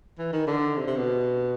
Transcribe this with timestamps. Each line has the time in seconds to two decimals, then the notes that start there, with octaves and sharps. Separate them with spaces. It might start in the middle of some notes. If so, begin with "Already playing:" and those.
0.18 E3
0.33 D#3
0.47 D3
0.77 C3
0.87 C3
0.97 B2